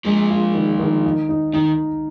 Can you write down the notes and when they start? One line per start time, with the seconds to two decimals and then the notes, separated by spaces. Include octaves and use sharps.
0.05 F3 G#3 A#3
0.30 F4
0.55 D#3
0.80 D#3
1.04 D#4
1.29 D#4
1.53 D#3 D#4